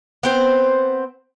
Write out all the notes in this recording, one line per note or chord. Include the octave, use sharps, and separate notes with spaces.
B3 C4 C5